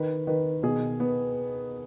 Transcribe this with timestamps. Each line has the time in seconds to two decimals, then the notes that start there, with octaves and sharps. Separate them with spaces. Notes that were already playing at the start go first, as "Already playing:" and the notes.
Already playing: D#3 B4
0.27 D#3 B4
0.63 B2 G#4
1.00 B3